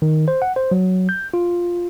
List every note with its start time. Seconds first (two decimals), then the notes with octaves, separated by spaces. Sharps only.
0.02 D#3
0.28 C5
0.42 F#5
0.56 C5
0.71 F#3
1.09 G6
1.34 F4